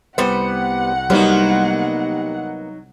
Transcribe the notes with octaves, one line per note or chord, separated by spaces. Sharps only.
C2 G3 B3 B4 C5 F#5
F#3 G3 A#3 B3 D#4 C5